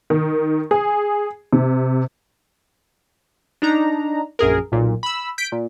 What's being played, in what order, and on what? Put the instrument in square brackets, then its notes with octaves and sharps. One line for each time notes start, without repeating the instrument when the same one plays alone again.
[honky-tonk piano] D#3
G#4
C3
[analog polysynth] D4 D#4 A#5
A#1 F#2 G#4 A#4
B1 A#2
B5 E6
G6 B6 D7
A#2